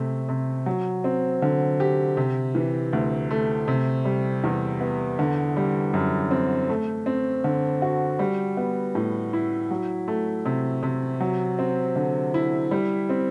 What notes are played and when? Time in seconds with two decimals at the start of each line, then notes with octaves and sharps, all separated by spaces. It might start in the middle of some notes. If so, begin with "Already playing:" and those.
Already playing: C3 A3
0.29 C3
0.66 F#3
1.04 C4
1.42 D3
1.80 G4
2.17 C3
2.55 E3
2.93 D2
3.31 A3
3.68 C3
4.05 G3
4.44 E2
4.81 B3
5.19 D3
5.57 G3
5.94 F#2
6.31 C4
6.70 A3
7.06 C4
7.44 D3
7.82 F#4
8.19 G3
8.57 B3
8.95 A2
9.33 E4
9.71 F#3
10.08 A3
10.45 C3
10.83 C3
11.20 F#3
11.59 C4
11.96 D3
12.34 E4
12.71 G3
13.09 C4